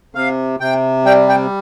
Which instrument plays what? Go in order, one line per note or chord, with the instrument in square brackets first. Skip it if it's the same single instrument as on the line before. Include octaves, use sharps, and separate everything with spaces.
[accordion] C3 F5
C3 G5
G3 G5
G5